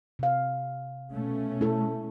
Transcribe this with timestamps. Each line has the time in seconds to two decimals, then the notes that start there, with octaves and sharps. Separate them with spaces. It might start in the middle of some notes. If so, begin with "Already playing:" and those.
0.19 C3 F5
1.12 B2 A3 C#4
1.61 E4 A4